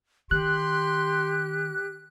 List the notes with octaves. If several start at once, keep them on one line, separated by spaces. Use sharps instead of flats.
D#3 G4 C6 F#6